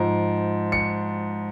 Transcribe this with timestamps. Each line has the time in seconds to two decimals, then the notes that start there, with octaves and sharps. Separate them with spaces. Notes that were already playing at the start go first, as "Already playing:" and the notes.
Already playing: G#2 F3
0.72 C#7